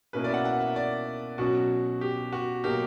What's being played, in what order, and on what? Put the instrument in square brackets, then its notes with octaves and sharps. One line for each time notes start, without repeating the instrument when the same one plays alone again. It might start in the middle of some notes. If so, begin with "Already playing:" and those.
[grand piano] B2 A#3 C#4 E4 B4
D5
E5
F#5
F#5
E5
D5
B2 F#3 C#4 F#4
G4
F#4
B2 F#3 A#3 G4